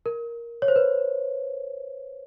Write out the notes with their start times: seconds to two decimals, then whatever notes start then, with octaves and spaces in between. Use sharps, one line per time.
0.06 A#4
0.62 C#5
0.68 C5
0.76 B4